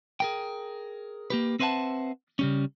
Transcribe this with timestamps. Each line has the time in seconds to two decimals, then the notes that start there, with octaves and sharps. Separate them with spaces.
0.20 G#4 A#4 G5
1.30 A#3 G4 B4
1.59 C4 B4 C5 E5 F#5 A5
2.39 C#3 G3 C#4